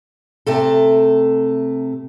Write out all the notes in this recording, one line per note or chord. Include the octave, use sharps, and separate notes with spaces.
C3 A3 A4